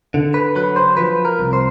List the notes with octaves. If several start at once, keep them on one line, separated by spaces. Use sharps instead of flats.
D3
B4
F#3 B4
C5
F3 B4
A#4
C2
C5